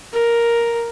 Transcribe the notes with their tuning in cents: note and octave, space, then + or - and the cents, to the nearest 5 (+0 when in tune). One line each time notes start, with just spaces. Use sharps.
A#4 +5